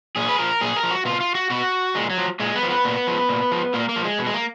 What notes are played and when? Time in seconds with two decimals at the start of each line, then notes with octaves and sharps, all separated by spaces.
0.16 A#2 G#4
0.28 B4
0.38 F3 A#4
0.61 A#2 G#4
0.76 A#4
0.83 F3
0.91 F#4
1.05 B2 F4
1.20 F4
1.35 F#4
1.50 B2 F#4
1.95 A#2 G#3
2.10 F#3
2.18 F3
2.40 A#2 G#3
2.55 B3
2.63 F3
2.70 B3
2.85 A#2
3.07 F3
3.29 A#2
3.52 F3
3.74 A#2 A#3
3.89 A#3
3.96 F3
4.04 G#3
4.18 B2
4.26 G#3
4.34 A#3